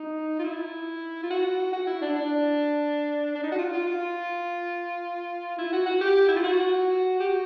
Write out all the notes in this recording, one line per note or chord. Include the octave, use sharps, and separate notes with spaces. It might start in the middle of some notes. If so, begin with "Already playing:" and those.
Already playing: D#4
F4
E4
F4
F#4
F#4
E4
D4
D4
D4
D#4
F#4
F4
F4
F4
E4
F#4
F#4
G4
E4
F4
F#4
G4
F#4